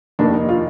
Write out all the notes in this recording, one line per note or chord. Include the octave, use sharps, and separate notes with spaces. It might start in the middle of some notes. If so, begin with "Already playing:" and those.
F1 D#2 D#3 D4
D#4
F4